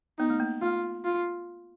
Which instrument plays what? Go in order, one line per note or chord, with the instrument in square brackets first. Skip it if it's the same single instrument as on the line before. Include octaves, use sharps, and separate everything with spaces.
[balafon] B3 [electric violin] D#4
[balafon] A3
A#3
[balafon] A3 [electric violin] F4
[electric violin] F4